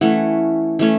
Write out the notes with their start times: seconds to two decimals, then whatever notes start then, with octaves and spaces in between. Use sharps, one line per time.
0.01 E3 A3 C#4 F#5
0.79 E3 A3 C#4